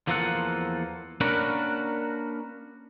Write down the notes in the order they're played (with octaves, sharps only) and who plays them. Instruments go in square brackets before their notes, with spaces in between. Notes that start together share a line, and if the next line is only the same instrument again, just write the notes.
[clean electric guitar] E2 F3 A#3 F4 A4 F#5
A#3 C#4 D4 F#4 A#4 B4